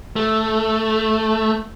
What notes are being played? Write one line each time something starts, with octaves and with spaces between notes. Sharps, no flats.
A3